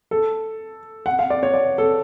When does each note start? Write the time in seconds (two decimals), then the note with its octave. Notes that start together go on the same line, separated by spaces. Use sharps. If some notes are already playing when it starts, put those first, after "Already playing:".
0.11 A4
1.06 F#5
1.19 F5
1.30 D5
1.43 C#5
1.54 D5
1.78 A4